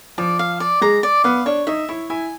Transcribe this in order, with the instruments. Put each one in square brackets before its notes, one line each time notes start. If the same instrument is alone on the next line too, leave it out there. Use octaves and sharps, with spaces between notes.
[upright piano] F3 [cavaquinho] D5
[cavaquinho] F5
D5
[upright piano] G#3 [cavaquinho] A#5
[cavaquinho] D5
[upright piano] B3 [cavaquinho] F5
[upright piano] D4 [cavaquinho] C#5
[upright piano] D#4 [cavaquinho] E5
[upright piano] E4 [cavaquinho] C#5
[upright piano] E4 [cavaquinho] G#5